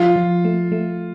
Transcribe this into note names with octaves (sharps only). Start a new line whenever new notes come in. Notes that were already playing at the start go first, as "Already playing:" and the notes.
Already playing: F3 F4
F3
A3
A3